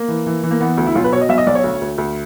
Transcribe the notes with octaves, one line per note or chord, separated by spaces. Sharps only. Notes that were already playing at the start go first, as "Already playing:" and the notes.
Already playing: A#3
E3
E3
E3
A#3
E3 B3
D2
E4
B1 F4
B4
B2 C#5
D#5
B1 E5
D#5
B1 D5
C#5
D2
D2
D2